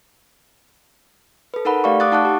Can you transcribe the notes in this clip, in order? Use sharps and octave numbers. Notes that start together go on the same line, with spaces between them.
A4 B4
D#4 A4 A#4 F#5 B5
A3 G4 D5 F5 C#6
D6 D#6 F#6 A6
D#4 F#5 A5 C#6 D6 F#6
D#4 G4